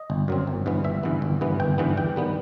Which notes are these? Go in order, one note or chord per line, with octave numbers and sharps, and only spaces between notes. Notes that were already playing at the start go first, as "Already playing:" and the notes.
Already playing: D#5
G1
F#2 F#3 C4
G1
G2 E3 B3
G1 E5
G2 E3 B3
G1
G2 E3 B3
G1 G5
G2 E3 B3
E2 G5
D#3 G3 B3